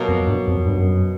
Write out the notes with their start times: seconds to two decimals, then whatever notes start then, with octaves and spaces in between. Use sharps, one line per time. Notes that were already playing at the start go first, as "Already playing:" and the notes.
Already playing: B2 F#3 A#3
0.08 F2
0.27 G2
0.47 F2
0.66 G2
0.77 F#2